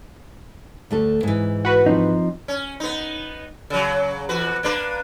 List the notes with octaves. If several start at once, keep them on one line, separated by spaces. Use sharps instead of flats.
D2 A3 A4
G#2 E3
F#4 B4
F3 C4 D#4
C#4
B3 D#4
C#3 F#3
E2 F#4 B4
A#3 D4 B4